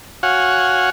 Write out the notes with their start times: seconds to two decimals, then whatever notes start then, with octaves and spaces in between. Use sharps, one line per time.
0.23 F#4 C#5 F5 F#5 G#5